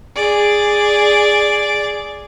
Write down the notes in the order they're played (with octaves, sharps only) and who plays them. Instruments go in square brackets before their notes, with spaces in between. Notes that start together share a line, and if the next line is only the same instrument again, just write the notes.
[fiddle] G#4 D5